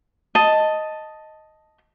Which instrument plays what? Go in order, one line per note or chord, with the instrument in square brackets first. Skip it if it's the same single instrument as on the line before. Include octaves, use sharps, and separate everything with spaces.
[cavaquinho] D#5 A5